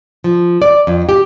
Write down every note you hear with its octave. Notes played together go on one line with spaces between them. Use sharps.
F3
D5
F2
G4